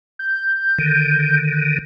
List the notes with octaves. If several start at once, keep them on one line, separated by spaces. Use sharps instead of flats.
G6
D3 D#3